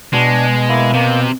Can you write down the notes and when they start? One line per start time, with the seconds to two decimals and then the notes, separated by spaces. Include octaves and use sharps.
0.13 B2 G#3 D4
0.69 A#3 E4
0.94 C3 A#3